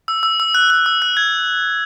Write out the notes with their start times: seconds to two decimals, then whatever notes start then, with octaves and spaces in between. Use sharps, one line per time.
0.08 E6
0.23 E6
0.40 E6
0.55 F#6
0.70 F#6
0.86 E6
1.02 F#6
1.17 G#6